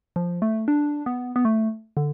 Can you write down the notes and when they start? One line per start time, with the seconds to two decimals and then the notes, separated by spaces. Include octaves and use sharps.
0.16 F3
0.42 A3
0.68 D4
1.06 B3
1.36 B3
1.45 A3
1.97 D3